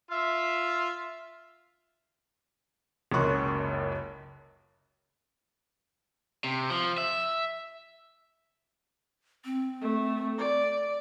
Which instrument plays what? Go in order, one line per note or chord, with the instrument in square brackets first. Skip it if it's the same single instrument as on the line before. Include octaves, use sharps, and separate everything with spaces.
[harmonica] F4 E5
[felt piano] F#1 C#2 F#2 C6 C#6 F#6
[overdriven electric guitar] C3
F3
E5
[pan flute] C4
[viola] A3
D5